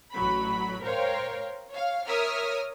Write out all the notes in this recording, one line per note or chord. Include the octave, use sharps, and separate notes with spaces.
A1 F#3 B5
A#4 C5 C#5 F5 G5
C#5 F5
A#4 C#5 E5 D#6 F6